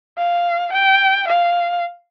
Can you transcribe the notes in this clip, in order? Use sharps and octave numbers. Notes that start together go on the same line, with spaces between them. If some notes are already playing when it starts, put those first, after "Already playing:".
F5
G5
F5